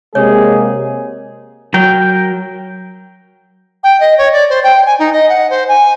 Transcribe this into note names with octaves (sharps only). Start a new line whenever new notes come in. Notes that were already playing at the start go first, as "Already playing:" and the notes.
C3 G#3 A#3 G#4 C#5
F#3 A#4 G5
G5
D#5
C#5
D5
C5
G5
G#5
D#4
D#5
F#5
C5
G#5